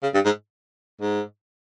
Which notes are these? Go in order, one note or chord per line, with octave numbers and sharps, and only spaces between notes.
C#3
G2
G#2
G#2